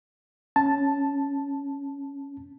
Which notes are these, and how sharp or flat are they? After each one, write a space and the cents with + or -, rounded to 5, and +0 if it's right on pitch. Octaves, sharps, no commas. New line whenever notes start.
C#4 +5 A5 +0